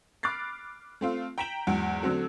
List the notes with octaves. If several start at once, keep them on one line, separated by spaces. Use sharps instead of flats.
B5 D6 F6 F#6 A6 C7
A3 C4 F4
G5 A#5 B6 D7 E7 F#7
E2 G#2 F#3
D3 F#3 A3 C4 F#4 A4